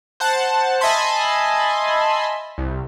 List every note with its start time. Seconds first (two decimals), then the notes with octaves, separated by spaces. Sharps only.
0.20 C5 F#5 A5
0.81 D#5 E5 G#5 A5 B5 C6
2.58 C2